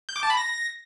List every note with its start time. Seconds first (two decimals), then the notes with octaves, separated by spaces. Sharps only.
0.09 G6
0.16 D6
0.23 A5
0.30 B5
0.37 A#6